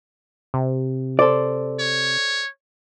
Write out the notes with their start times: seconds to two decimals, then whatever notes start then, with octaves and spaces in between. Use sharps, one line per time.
0.54 C3
1.19 A4 C5 D5
1.80 C#5